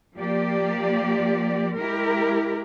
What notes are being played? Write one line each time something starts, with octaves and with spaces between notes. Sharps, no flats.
F3 A#3 G4 D5
G#3 E4 G4 A#4